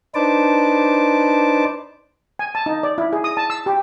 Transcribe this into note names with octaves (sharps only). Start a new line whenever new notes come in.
D4 D#4 B4 C5 A5 D6
G#5
A5
D#4
D5
E4
G#4
D#6
A5
E6
G4